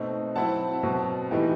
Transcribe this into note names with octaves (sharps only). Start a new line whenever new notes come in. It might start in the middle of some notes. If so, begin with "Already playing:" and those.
Already playing: B2 A3 C4 D#4
F#3 C4 E4 F#5 A5
B2 F#3 C4
A2 E3 G3 B3 D#4